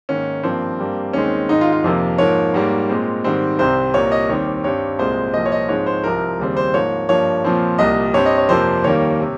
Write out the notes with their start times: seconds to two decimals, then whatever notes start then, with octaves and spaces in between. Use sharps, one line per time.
0.09 G#2 D#3 A#3 C#4
0.43 G2 F3 A#3 C4
0.79 G2 G3 A#3
1.13 D#2 D#3 G#3 C4 C#4
1.49 G#2 D#3 G#3 D#4
1.61 F4
1.72 F4
1.84 F2 C3 F3 A#3
2.18 G#2 F3 A#3 C#5
2.54 G#2 G3 A#3
2.89 A#2 G#3 C4
3.24 G#2 D#3 G3 C4
3.59 C2 C3 G3 C4 C5
3.94 C2 A#2 G3 A#3 C#5
4.12 D#5
4.29 D#2 D#3 G3 C4 C#5
4.64 G2 G3 C4 C#5
4.99 C2 A#2 G#3 C4 C5
5.34 C2 A#2 F3 C4 D#5
5.46 C#5
5.52 D#5
5.69 G#2 F3 G#3 C4 C#5
5.86 C5
6.04 C2 C3 F3 C4 A#4
6.39 D#2 C#3 G3 C4
6.57 C5
6.74 G#2 F3 A#3 C#5
7.09 G2 F3 A#3 C#5
7.44 A#2 F3 C4
7.79 C2 A#2 G3 D#5
8.14 G2 G3 C4 C#5
8.26 D#5
8.38 C#5
8.49 F2 C3 F3 A#3 C5
8.84 D#2 D#3 G3 A#3 C#5
9.21 C3